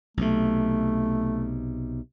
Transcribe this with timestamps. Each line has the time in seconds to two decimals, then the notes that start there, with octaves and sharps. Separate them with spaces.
0.17 B1 C3 A3